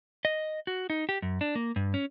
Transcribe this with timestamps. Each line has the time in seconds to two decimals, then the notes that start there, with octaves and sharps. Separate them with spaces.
0.25 D#5
0.67 F#4
0.90 D#4
1.09 G4
1.22 F#2
1.41 D4
1.55 A#3
1.76 G2
1.94 C#4